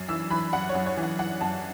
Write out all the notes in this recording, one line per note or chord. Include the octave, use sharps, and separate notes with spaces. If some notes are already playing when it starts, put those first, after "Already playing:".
Already playing: F#2
E3 E6
E3 B5
F#2 F#5
C#5
F#2
C#5
E3
F#5
E3 F#5
F#2 A5